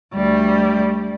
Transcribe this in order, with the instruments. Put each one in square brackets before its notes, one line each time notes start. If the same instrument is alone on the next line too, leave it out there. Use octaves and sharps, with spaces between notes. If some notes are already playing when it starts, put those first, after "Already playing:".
[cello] D2 G3